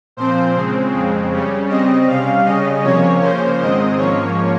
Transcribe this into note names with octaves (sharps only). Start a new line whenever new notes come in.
A#2 F3 C4 C5
C#3 G#3 C4
F2 C#3 G#3 C4
C#3 G3 C#4
C#3 G3 C4 D#5
C3 G3 C#4 F5
C#3 G3 C#4 D#5
C3 F3 A#3 C#4 C#5
C#3 F3 A#3 C#4 C5
G#2 D#3 G#3 C4 D#5
G#2 F3 A#3 C#4 C#5